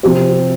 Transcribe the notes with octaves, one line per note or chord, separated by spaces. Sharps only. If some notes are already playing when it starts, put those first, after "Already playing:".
C3 F3 C4 G4 C5